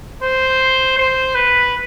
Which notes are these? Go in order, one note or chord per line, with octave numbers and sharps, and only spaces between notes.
C5
C5
B4